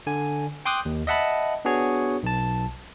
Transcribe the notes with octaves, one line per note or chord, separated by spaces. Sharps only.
D3 G#5
G5 C6 D6 D#6 F#6 G6
D#2
D#5 E5 F#5 A5 B5
B3 D4 F#4 G#4 C#5
B1 A5